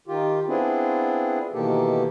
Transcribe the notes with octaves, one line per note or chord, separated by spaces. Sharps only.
D#3 F4 G4
B3 C4 D4 E4 F4 G#4
B2 D#3 E3 A#3 G4 A4